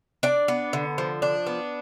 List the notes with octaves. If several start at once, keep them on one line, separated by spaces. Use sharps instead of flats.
D4 D5
B3
D3
F3
D4
B3